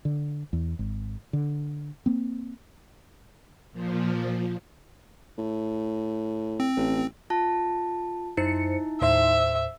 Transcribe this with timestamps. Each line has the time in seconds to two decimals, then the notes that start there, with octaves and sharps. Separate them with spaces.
0.05 D3
0.53 E2
0.79 G#1
1.33 D3
2.06 A#3 C4
3.72 A#2 F3
5.38 A2
6.60 C4
6.76 A1
7.30 F4 A5
8.37 F#2 D#4 E4 C5 C#7
9.01 D#2 A2 C5 E5